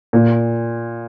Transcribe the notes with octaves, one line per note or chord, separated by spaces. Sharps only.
A#2